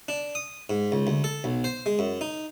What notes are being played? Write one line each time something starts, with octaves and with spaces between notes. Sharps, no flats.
D4
D#6
G#2
C#2
D2
A4
B1
C5
G#3
F#2
D#4